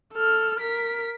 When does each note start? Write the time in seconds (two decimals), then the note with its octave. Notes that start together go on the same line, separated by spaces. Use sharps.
0.14 A4 F6
0.60 A#4 B6